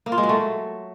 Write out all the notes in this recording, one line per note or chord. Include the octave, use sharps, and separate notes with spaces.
A#3
F4
G#3
F#3
A3